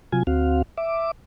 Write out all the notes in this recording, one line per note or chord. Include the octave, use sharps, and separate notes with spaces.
C3 F#3 F4 G#5
D2 C4 F#4 F5
E5 D6